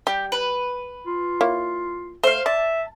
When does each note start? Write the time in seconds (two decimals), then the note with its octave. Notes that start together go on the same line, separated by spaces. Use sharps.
0.07 G3 G4
0.32 B4
1.07 F4
1.41 A#3 E4 C#5
2.24 A3 C5 F5
2.46 D5 E5 A5